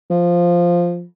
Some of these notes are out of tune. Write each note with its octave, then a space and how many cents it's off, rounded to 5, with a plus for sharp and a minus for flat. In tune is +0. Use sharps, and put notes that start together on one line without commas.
F3 +0